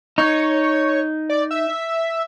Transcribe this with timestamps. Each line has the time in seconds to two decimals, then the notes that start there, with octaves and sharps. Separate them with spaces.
0.18 D#4 C#5
1.30 D5
1.51 E5